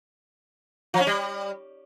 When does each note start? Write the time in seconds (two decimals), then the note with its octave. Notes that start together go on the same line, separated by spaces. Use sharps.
0.94 F3
1.00 C#4
1.07 G3